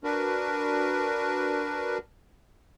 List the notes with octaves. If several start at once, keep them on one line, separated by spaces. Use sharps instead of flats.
D4 F#4 A#4 B4